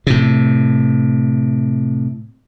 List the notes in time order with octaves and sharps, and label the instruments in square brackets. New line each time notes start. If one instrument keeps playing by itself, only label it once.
[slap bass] A2 C3